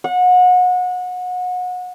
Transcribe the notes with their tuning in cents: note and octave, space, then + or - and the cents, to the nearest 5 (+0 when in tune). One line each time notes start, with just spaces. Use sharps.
F#5 -30